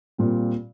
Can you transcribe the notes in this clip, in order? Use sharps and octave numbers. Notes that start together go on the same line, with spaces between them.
A#2 G3 C4 F4